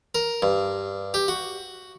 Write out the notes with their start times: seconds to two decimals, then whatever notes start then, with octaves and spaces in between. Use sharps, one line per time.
0.15 A#4
0.42 G2
1.14 G4
1.28 F#4